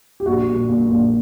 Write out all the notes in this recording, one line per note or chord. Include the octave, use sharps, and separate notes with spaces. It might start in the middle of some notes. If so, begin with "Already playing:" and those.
G4
A#1 F#4
A#2
A#2
A#1